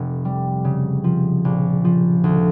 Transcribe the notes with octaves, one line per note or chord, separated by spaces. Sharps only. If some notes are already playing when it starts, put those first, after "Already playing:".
Already playing: F1 C3
G3
C#3
F3
A#1
F3
D2